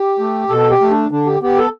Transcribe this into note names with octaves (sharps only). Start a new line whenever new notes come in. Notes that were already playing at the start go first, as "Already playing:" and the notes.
Already playing: G4
A3
B2 A4
G4
A3
D4
D3 D4
G4
B3 G4
A4